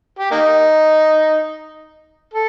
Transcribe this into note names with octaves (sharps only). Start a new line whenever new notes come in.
G4
A#3 D#4
A4